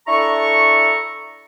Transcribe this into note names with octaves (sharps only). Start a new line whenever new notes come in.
D4 E4 A4 A#5 C#6